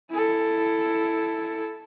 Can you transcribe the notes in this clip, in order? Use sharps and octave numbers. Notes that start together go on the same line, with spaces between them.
E4 A4